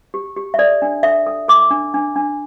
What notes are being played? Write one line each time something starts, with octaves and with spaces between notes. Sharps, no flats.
G4
G4
E5
A4 D5
D4
A4 E5
A4
A4 D6
D4
D4
D4